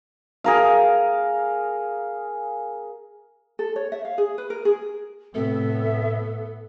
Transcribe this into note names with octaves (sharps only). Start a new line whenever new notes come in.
G#4 A#4 F5
A4
C#5
E5
F5
G#4
B4
A#4
G#4
A2 C3 A3 B3 A4 E5